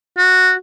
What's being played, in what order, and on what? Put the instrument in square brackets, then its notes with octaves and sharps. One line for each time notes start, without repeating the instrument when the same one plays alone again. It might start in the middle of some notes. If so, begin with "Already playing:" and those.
[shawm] F#4